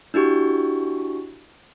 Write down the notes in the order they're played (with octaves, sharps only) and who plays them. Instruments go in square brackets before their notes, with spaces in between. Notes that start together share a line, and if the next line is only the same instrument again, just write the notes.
[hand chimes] D4 E4 F#4 G4 C#6